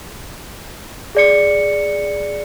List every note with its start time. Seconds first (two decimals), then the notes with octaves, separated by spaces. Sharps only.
1.15 G#4 D5 C#7